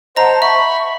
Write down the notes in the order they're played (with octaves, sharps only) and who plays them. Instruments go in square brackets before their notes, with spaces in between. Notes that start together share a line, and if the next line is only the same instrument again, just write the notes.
[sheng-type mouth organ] C5 [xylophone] D#5 A#5 [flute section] F#5 A5
[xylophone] E5 [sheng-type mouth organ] B5 [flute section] C#6